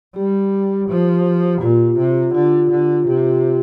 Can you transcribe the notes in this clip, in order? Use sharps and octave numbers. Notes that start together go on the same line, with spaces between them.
G3 G4
F3
A#2 F4
C3
D3 F4
D3
C3 G4
F4
G4